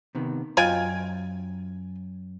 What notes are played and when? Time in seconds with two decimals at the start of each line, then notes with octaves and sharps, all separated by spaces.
0.15 C3 D#3 B3
0.57 F#2 F4 D#5 G5 G#5